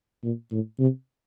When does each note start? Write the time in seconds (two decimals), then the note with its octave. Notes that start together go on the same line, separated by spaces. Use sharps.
0.24 A#2
0.51 A2
0.79 C3